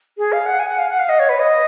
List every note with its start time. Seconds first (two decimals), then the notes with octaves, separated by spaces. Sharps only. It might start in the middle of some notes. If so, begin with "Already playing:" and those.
0.18 G#4
0.32 F5
0.46 F#5
0.59 G#5
0.69 F#5
0.79 F5
0.89 F#5
0.99 F5
1.09 D#5
1.19 C#5
1.29 B4
1.39 D#5